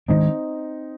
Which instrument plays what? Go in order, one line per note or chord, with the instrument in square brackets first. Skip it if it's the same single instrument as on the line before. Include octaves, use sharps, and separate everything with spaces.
[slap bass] D#3 G#3 D4 [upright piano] C4 D#4